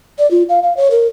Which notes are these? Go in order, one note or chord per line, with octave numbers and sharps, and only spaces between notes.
D5
F4
F5
F5
C#5
A#4